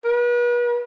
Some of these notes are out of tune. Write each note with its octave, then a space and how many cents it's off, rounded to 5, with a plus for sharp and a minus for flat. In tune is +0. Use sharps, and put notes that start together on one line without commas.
B4 -40